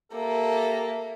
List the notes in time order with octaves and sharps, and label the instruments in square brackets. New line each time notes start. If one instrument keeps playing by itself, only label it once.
[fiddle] A#3 [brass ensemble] G4 A4 [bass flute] E5